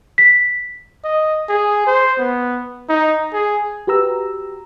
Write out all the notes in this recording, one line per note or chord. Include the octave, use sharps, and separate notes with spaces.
B6
D#5
G#4
C5
B3
D#4
G#4
F#4 G4 B4 A#5 E6